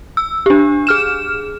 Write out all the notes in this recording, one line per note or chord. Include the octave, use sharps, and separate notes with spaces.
E6
D4 G4
G#4 F6 E7